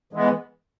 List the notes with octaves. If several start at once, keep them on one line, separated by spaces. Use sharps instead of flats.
E3 G#3 B3